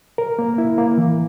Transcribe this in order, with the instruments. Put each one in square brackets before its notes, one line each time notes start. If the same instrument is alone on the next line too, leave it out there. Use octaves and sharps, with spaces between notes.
[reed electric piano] A#4
A#3
E4
A#3
E3